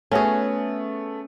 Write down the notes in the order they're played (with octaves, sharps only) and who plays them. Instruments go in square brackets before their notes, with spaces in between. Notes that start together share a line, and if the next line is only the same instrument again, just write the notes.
[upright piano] A3 B3 [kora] C#4 F#4 G#4